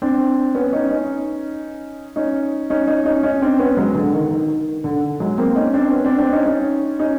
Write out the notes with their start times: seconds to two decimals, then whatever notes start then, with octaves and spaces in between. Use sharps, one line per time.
0.02 C4 D4
0.55 B3 C#4
0.73 C#4 D#4
0.90 C#4 D#4
2.16 C#4 D#4
2.70 C#4 D#4
2.87 C#4 D#4
3.05 C#4 D#4
3.23 C#4 D#4
3.42 C4 D4
3.59 B3 C#4
3.77 F#3 G#3
3.95 D3
4.14 D#3
4.31 D#3
4.84 D3
5.20 F#3 G#3
5.38 A#3 C4
5.56 C#4 D#4
5.74 C4 D4
5.92 B3 C#4
6.05 C4 D4
6.18 C4 D4
6.32 C#4 D#4
6.45 C#4 D#4
6.99 C#4 D#4